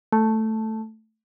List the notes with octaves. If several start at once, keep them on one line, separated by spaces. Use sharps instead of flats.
A3